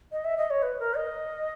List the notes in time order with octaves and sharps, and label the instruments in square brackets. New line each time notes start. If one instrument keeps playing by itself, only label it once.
[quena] D#5
E5
D#5
C#5
B4
A#4
D#5